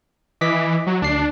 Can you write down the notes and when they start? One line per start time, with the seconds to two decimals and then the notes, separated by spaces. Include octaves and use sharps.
0.41 E3 D#5 D6 B6
0.87 F#3
1.02 D2 D4 C7